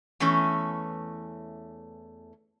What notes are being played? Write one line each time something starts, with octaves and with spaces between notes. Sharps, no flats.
E2 E3 A3 C#4